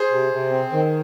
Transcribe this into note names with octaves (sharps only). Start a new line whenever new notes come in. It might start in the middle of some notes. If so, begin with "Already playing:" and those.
Already playing: G#4 C5
C3
C3
C4
D#3